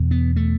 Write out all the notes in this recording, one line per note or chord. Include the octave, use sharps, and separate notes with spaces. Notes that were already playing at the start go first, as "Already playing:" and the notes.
Already playing: E2 B2
B3
A3